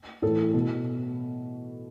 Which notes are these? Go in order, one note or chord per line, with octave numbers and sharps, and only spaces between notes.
A2 E3 A4
B2